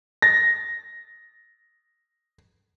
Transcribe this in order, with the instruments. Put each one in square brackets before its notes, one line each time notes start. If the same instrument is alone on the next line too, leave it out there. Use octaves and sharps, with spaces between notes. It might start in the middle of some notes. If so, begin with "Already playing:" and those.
[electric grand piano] A6 A#6